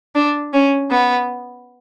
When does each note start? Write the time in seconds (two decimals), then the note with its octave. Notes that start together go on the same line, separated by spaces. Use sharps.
0.15 D4
0.53 C#4
0.91 B3